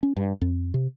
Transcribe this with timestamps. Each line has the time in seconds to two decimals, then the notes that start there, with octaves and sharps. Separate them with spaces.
0.03 C#4
0.17 G2
0.41 F2
0.74 C3